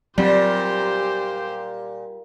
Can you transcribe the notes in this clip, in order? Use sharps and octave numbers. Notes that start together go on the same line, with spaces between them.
A#2 F#3 G3 C4 G4 C5